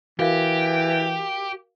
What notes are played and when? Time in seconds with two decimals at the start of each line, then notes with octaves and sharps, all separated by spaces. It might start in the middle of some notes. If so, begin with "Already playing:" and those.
0.19 E3 F#4 G4 A#4 F5